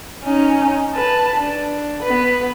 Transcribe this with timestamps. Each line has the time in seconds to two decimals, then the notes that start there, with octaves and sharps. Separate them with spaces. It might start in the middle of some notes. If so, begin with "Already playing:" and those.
0.24 C#4 D#4
0.94 B4 A5
1.37 D4
2.03 B3 B4